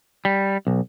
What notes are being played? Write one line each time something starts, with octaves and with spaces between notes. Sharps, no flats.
G3
B1